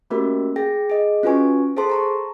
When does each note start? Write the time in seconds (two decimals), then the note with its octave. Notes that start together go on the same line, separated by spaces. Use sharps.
0.10 A3 A#3 C#4 F#4 G4 A#4
0.56 G#4 G5 A#6
0.90 G#4 D#5
1.23 C#4 F4 F#4 B4 G#5 C#6
1.77 G#4 A4 C5 A5 C6
1.90 A5 A#5 C#6